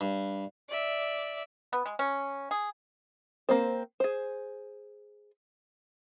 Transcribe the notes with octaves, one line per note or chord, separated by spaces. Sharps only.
G2
D5 E5
B3
G#3
C#4
G#4
A#3 C4 C5
G#4 C5